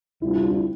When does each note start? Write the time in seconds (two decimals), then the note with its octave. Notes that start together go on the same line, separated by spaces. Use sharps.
0.21 D2 C3 G3 D4 E4 F4
0.36 E4
0.51 E4